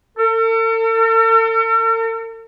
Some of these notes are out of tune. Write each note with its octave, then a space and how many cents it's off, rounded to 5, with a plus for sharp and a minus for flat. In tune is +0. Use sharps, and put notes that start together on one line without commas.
A4 +45